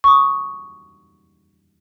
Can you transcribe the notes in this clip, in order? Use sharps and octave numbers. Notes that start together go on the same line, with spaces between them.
C#6 D#6